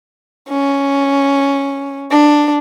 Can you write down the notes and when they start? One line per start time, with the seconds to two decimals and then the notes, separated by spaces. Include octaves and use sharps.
0.49 C#4
2.11 D4